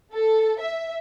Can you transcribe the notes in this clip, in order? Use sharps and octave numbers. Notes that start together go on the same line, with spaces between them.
A4
E5